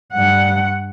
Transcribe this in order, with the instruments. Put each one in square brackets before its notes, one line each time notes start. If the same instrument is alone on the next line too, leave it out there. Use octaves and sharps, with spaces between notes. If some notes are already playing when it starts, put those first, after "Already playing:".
[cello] G2 F#5